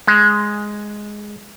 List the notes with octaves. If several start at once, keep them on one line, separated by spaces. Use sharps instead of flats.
G#3